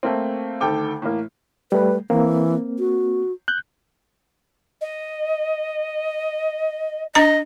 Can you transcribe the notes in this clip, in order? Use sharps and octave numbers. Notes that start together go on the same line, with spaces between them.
A3 A#3 C4
D2 D#3 A4 G5 D6
A2 E3 A#3
G3 A3 B4
E3 A#3 C4
F#4
F#6 G6
D#5
D4 D#5 A#5